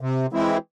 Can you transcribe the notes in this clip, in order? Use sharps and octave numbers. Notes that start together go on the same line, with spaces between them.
C3
E3 G#3 C4 E4